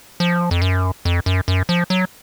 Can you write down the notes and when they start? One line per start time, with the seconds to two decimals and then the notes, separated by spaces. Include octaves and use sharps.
0.20 F3
0.51 F2
0.62 F#2
1.05 F2
1.26 F#2
1.48 F#2
1.69 F3
1.90 F#3